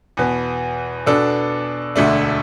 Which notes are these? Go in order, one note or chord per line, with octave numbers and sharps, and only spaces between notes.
E2 B2 B3
B2 B3 D4 A4
E1 D2 D3 A3 D4